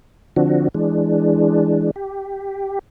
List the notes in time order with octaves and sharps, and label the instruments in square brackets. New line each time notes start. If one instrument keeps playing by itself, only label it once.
[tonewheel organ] D3 F3 C4 D4 F#4
E3 G#3 D4
G4